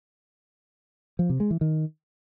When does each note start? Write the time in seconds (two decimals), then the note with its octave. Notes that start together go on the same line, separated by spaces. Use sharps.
1.19 F3
1.30 C3
1.40 G#3
1.51 E3
1.61 D#3